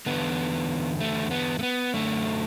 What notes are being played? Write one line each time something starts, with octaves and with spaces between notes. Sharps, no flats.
E2 D3 B3
A3
B3
A3
B3
F#2 D3 A3